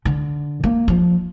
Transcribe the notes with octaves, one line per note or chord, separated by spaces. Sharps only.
D3
A#3
F3